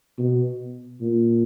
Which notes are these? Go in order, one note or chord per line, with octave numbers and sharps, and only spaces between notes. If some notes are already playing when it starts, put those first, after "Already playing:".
B2
A#2